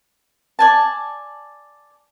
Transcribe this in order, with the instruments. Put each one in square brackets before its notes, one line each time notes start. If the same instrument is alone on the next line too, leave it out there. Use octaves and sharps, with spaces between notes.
[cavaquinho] D5 G#5 A5